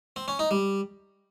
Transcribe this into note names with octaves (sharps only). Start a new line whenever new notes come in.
C4
C#4
D#4
G3